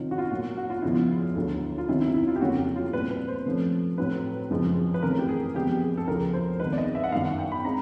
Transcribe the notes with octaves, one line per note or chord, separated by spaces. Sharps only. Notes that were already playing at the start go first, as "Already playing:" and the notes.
Already playing: C3 D#3 F#3 F4
F#4
F4
A#2 F#3 A#3 F#4
F#4
F4
E2 C#3 F3 G#3 B3 E4
F4
D2 D3 F#3
F4
C3 D#3 F#3 E4
E4
E4
F4
G4
F2 C#3 F#3 A#3 C#4 F#4
G4
F4
A#2 G3 C4 B4
B4
C5
C3 F3 A3 C#4
A2 F#3 A3 C4 B4
F#2 C#3 F3 G#3 C4
B4
C3 E3 A3 C#4 A#4
G4
G#4
E2 C3 F3 G#3 B3 G4
G4
G#4
A4
D2 C#3 F3 A#4
C5
E2 C3 D#3 G#3 B4
D5
D#5
E5
F#5
F#2 D#3 G3 F5
F#5
G5
B5
G#3 C4 A#5